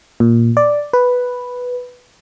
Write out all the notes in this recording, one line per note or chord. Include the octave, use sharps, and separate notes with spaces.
A#2
D5
B4